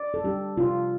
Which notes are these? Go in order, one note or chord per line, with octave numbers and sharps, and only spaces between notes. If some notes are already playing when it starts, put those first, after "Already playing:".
Already playing: D5
A4
G3 D4 G4
C3 F4